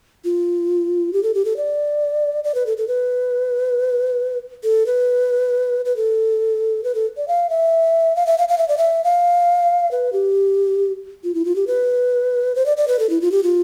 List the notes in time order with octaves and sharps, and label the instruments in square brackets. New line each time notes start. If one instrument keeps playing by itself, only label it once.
[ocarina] F4
G4
A4
G4
A4
D5
D5
B4
A4
A4
B4
A4
B4
B4
A4
B4
A4
D5
F5
E5
F5
E5
F5
F5
E5
D5
E5
F5
B4
G4
F4
E4
F4
G4
B4
C5
D5
D5
B4
A4
E4
F4
G4
F4